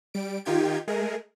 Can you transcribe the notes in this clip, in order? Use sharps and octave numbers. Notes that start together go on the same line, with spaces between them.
G3 D7
D#3 D#4 F4 G4 G5 G#6
G#3 A3 G#4 A#4